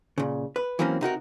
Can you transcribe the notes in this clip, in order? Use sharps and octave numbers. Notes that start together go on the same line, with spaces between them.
A#2 C#3
B4
E3 F#3 A#3 C4 C#4
C3 D#4 F#4 A#4